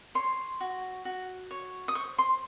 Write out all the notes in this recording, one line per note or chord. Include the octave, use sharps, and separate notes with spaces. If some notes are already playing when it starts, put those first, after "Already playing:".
C#5 C6
F#4
F#4
C#5
D#6
C5 C#6
C6